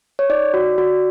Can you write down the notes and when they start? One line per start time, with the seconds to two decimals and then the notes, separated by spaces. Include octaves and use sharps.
0.19 C#5
0.29 D#4 D5
0.54 F#4
0.78 F#4